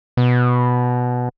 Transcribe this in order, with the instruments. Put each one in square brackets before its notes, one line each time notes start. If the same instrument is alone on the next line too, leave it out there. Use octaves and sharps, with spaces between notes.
[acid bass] B2